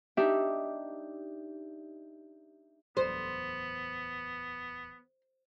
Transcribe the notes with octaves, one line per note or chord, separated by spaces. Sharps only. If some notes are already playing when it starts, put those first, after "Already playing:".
D4 D#4 G4 D5 E5
D1 E2 B3 C5